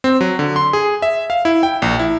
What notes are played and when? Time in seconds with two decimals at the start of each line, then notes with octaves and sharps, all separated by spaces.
0.04 C4
0.21 F#3
0.39 D3
0.56 C6
0.73 G#4
1.02 E5
1.30 F5
1.45 E4
1.63 G5
1.82 A#1
1.99 E4